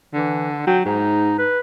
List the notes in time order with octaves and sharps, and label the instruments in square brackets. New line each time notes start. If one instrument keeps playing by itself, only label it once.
[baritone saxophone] D3 [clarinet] E3
[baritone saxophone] F#3 [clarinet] G5
[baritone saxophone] G#2 [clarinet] D#4
[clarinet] B4